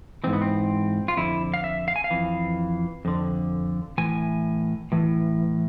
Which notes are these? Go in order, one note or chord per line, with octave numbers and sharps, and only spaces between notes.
G#2 E3 C4
B3
C4
F4
F2 D3 E4
F5
E5
F5
G#5
F5
F2 E3
F2 D3
A2 E3 G#5
A2 E3